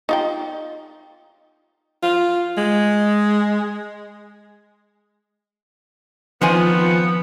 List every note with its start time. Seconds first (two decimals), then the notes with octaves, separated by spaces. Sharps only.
0.09 D#4 F4 G5
2.03 F4
2.57 G#3
6.41 D#3 F3 B3 C4 G#5